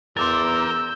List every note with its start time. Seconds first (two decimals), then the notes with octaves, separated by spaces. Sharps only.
0.17 E2 A#4 C6 D6 E6 G6 A6